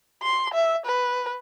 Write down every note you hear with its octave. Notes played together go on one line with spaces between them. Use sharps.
C6
E5
B4